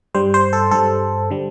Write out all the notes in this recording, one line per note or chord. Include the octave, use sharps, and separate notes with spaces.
G2 G3 C5
C5
A4
G2 G3 A4
D3 G3